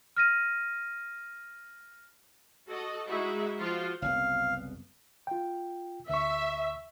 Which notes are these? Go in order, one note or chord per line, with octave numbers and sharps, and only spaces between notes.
F6 A#6 D#7
F#4 A4 D#5
G#3 D#4 E4 F#4 E5
F3 F4 F#4 C5
F#1 C2 B3 F5
F4 G5
D2 E5 C#6